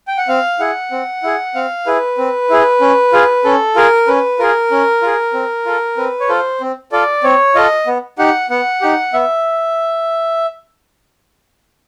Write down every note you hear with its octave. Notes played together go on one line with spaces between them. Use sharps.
G5
F#5
C4 F5
E4 G#4 F#5
C4
E4 G#4
C4 F5
E4 G#4 B4
C4
E4 G#4
C#4
F4 G#4
C#4 A4
F4 G#4 A#4
C#4 B4
F4 G#4 A#4
C#4
F4 G#4
C4
F4 A4
C4 B4
C#5
F4 A4 C5
C4
F4 A4 D5
C4 C#5
F4 A4 D#5
B3
D#4 G4 F#5
B3 F#5
D#4 G4
B3 E5